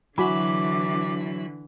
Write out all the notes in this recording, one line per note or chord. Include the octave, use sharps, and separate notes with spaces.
D3 E3 F#3 E4 F#4 G#5 B5 D6